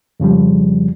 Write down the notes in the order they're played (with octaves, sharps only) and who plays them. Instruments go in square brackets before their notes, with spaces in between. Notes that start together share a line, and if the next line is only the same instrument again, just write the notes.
[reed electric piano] F2 C#3 F3 G3